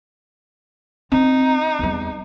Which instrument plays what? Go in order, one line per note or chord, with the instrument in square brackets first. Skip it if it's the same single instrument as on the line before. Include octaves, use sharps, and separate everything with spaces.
[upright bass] C4 [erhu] D#4
[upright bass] E2 G3